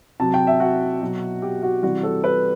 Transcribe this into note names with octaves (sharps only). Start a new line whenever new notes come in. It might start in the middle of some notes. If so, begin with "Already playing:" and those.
C3 F#3 A5
G5
E5
F#4
B2 F#3
G4
F#4
C3 E3 G3 F#4
A4
B4